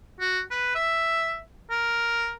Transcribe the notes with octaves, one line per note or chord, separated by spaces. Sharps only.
F#4
B4
E5
A#4